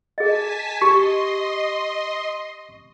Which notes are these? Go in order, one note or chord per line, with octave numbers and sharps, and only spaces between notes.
G#4 D#5 G#5 A5 B6
G4 D#5 C6 C#6